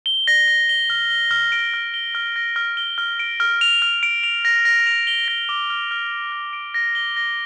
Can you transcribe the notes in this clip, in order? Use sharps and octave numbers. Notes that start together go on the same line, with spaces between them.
G7
A#6
A#6
G7
F6
G7
F6
D7
F6
G7
F6
A#6
F6
G7
F6
D7
F6
F7
F6
D7
F7
A#6
A#6
F7
G7
A#6
D6
F6
F6
F7
F6
D7
A#6
G7
A#6